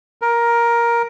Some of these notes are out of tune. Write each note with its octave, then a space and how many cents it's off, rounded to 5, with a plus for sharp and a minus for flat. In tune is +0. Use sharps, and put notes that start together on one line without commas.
A#4 +10